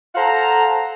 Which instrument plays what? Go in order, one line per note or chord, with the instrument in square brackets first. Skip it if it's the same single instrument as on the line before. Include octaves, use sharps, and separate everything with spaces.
[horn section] A4 C5 F5 F#5 A#5